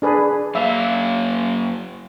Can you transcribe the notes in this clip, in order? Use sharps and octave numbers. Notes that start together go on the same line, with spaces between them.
D4 G#4 B4
F#2 A#3 E5 F5